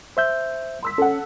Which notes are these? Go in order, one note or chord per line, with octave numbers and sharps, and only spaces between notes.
C5 E5 G6
C6 E6 B6
C#4 A4 F#5